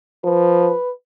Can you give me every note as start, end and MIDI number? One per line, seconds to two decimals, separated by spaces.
0.24 0.72 53
0.24 0.91 71